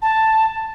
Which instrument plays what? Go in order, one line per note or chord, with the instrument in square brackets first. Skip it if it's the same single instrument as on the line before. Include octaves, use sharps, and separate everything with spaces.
[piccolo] A5